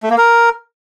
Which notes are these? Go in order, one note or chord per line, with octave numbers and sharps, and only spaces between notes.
A3
A#3
A#4